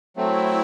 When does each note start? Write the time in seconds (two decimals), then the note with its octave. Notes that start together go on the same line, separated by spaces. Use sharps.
0.16 F#3 A3 C4 E4